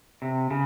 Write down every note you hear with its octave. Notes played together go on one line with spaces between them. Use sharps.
C3
C#3